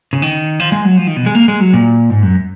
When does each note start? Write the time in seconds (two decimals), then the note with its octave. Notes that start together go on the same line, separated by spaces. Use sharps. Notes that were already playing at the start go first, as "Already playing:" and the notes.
0.13 C#3
0.22 D#3
0.60 F3
0.72 G#3
0.85 F#3
0.97 F3
1.07 D#3
1.17 B2
1.26 G#3
1.35 A#3
1.48 G#3
1.60 F#3
1.73 A#2
2.10 G#2
2.23 F#2